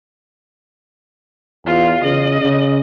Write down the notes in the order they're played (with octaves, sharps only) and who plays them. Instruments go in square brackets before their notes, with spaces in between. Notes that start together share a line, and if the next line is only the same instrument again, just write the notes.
[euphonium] E2 [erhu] F4
[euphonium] C#3 [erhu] D#5
[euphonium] C#3